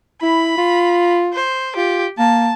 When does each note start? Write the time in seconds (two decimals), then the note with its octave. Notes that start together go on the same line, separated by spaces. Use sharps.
0.22 E4 B5
0.57 F4
1.34 C5
1.77 F4 G4
2.18 A#3 A5